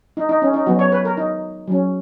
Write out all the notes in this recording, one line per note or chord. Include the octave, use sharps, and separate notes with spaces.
D#4
D#4
C#4
D#4
F#3 B3 F#4
C#5
B4
A#4
D#4
F#3 C#4